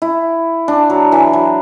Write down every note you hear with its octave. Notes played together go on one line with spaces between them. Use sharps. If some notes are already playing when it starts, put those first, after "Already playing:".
E4
D4
F#3
E3
F#3